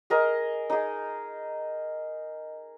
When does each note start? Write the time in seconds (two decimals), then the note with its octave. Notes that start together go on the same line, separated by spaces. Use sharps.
0.10 G#4 A#4 D#5
0.70 D#4 G#4